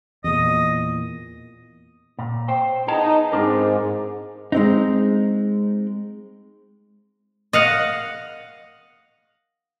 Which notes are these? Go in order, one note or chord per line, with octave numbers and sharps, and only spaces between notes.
E2 A#2 D#5
A#2
C5 G5
B3 D#4 G#4 A5
G#2 C4 D4 A#4
G#3 C4 D#4
D#5 F5 F#5